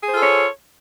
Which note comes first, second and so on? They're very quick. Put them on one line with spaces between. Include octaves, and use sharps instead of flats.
G#4 C5 F4 A4 C#5